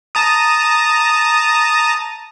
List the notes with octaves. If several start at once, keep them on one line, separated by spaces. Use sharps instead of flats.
A5 A#5 D#6